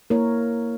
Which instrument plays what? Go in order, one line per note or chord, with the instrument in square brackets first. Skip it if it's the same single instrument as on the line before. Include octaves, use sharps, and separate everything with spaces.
[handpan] A#3 E4 A#4 C#5